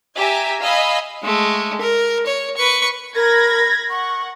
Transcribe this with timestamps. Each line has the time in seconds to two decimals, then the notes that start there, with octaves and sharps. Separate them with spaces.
0.16 G4 E5 G#5 A#5
0.60 D#5 F5 G#5 B5 E6
1.23 G#3 A3
1.81 A#4
2.26 C#5
2.57 B4 C#6
3.15 A#4 B5 G#6 A#6
3.90 F#5 C#6